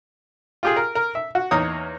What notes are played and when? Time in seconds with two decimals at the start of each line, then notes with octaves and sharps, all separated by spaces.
0.63 F4 G4 G#4
0.76 A#4
0.95 A#4
1.15 E5
1.35 F#4
1.51 E2 A#3 D#4 C#5 D#6